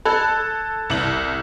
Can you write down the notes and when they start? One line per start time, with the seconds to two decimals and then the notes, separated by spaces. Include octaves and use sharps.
0.05 A4 B5 F#6 G#6
0.90 C2 F#7